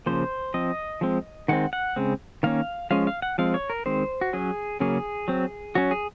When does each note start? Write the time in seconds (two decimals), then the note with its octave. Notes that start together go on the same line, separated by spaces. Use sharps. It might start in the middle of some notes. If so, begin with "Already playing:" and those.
0.06 C#3 F3 A#3 C5
0.54 F3 C4 D#5
1.01 F3 G#3 C4
1.48 D#3 G#3 C4 F#5
1.73 F#5
1.96 C#3 G#3 C4
2.43 D#3 A#3 C#4 F5
2.91 F3 G#3 C#4 F5
3.07 F5
3.22 F#5
3.38 F3 G#3 C4 F5
3.54 C#5
3.70 A#4
3.86 D#3 G#3 C4 C5
4.21 F#4
4.33 F#3 C#4 G#4
4.80 C#3 F#3 A#3 C#4 G#4
5.28 F#3 C4
5.75 F#3 C#4 F#4
5.91 G#4